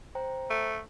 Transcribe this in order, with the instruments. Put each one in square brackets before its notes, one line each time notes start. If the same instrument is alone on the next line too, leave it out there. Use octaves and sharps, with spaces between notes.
[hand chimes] C5 G5 A#5
[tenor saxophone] A3